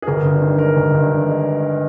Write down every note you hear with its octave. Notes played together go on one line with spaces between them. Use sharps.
G#4
G1 A#4
G2
D#3
G#3 A#4
G1
G2
D#3
G#3